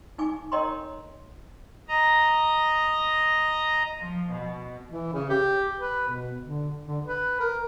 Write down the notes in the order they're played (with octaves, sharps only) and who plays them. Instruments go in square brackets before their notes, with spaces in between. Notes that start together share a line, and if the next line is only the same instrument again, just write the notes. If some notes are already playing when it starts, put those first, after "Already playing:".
[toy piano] D#4 G#5 D6
A#4 C#5 D#5 G5 A#5 C6
[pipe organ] D#5 A#5
[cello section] F3
B2
[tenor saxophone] E3
C#3
G4
B4
B2
D3
D3
B4
A#4